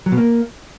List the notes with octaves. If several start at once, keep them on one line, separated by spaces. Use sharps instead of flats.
F#3
B2
A#3